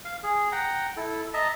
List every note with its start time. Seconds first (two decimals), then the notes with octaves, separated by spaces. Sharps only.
0.05 F5
0.23 G#4
0.52 F#5 G5 A#5
0.97 E4 A4
1.34 D#5 E5 A5 A#5